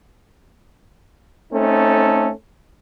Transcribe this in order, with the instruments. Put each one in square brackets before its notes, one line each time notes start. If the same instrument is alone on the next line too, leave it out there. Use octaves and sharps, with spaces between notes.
[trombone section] A3 C4 C#4 D#4 A4